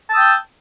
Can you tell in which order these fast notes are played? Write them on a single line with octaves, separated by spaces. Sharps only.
A5 E6 D#6 G5